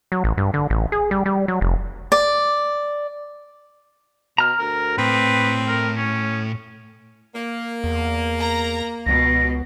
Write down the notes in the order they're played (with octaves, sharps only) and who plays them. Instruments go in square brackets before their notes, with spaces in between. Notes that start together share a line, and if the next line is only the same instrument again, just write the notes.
[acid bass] F#3
A1
G2
D3
A1
G#4
G3
G3
F#3
F1
[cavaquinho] D5
[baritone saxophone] B2 [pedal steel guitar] A#5 F6
[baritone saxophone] D2 [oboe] A#4
[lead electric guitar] A2 [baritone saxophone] C4 [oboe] B4
[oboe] A#4
C#4
[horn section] A#3
[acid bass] E2
[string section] A#5
[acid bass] C#2 [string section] B2 [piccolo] A#6